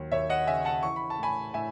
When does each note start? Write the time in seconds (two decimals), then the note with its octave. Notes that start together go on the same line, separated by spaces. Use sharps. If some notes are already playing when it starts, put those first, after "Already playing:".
Already playing: D#2 F#3
0.12 D#2 C#5 E5
0.29 D#5 F#5
0.47 C#3 E5 G#5
0.65 F#5 A5
0.83 E3 C#6
0.96 B5
1.10 A5
1.18 A2 G#5 B5
1.54 A2 E5 G#5